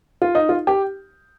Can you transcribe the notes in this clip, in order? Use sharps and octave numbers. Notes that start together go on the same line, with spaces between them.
F4
D#4
F4
G4